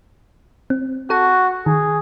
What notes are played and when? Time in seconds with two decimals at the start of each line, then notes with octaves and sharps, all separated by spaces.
0.70 C4
1.10 F#4 A4 F#5 A5
1.66 D#3 G#4